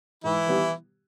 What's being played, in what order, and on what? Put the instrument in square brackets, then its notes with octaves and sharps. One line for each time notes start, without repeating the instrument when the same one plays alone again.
[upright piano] G#2 [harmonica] E3 E4
[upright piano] D#3 G3 B3 G4